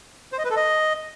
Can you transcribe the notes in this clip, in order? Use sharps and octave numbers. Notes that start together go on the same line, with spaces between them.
C5
D#5
B4
A4
D#5